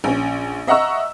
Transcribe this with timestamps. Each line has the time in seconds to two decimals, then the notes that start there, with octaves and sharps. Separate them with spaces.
0.04 A#1 C#4
0.67 D#5 E5 F#5 A#5 C#6 E6